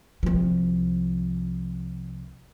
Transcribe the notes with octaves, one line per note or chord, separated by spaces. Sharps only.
C2 F3